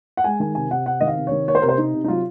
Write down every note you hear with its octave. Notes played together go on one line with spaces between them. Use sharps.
F#5
G#3 G#5
D#3 G#5
C3 G#5
C3 F#5
C3 F#5
D#3 D#5
F5
C3
D#3 C#5
A#3 C#5
C5
C3 A#4
C5
C3 D#4
C3
D#4
F#3 F4